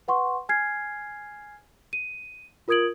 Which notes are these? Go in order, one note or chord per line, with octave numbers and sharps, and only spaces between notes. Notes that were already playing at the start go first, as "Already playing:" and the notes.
B4 F#5 C6 C#6
G#5 F6 G#6 C7
D#7
F4 A#4 D#6 G#6 D7 F#7